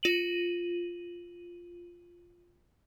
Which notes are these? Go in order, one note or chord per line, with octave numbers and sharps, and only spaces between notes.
F4 D#7 F#7